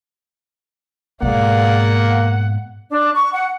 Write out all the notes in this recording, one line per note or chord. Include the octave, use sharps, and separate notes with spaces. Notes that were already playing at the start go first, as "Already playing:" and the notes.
G#2 B2 A#3 G#4 D5 F5 F#5
D4
C#6
F#5